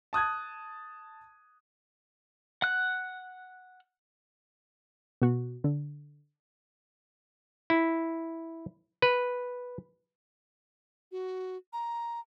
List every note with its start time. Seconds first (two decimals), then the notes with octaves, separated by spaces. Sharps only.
0.13 A5 D#6 F#6 G#6
2.62 F#5 F#6
5.22 B2 F#4
5.64 D3
7.70 E4
9.02 B4
11.11 F#4
11.73 A#5